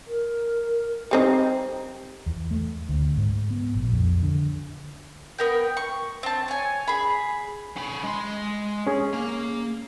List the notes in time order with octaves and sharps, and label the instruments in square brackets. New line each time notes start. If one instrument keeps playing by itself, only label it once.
[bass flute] A#4
[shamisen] G3 C4 D#4
[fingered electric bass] E2
A3
D2
G#2
B3
A#1
F2
D3
[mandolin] B3 A#4 G5
C#6
C4 A5
C#5 G#5
G#4 B5
[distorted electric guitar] C#4 B5
G#3 C6
[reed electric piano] C#4 G#4
[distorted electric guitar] A#3